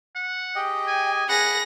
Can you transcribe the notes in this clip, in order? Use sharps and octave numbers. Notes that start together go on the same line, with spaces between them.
F#5
G4 G#4 D#5 G5
G#5
G#4 F#5 B5 A#6